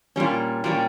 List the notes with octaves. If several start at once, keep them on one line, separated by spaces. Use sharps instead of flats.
A#2 G3 C#4
A#2 G3 C#4